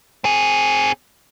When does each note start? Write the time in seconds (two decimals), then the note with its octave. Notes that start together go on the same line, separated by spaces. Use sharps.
0.24 C4 G#4